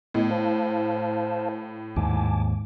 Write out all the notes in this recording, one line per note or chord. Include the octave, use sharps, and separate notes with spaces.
A2 B3 D#5
C5 F5 A5
D#2 G#2 G#5 A5 D6